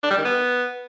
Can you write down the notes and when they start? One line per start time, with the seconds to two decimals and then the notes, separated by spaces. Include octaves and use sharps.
0.03 D4
0.11 G3
0.18 D#3
0.25 B3